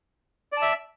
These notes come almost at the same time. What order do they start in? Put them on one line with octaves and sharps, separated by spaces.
D5 A5 E5